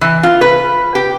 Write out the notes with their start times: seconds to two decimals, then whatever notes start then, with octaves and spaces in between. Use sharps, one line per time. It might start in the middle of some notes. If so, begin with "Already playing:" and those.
0.01 E3
0.23 F4
0.41 B4
0.95 G4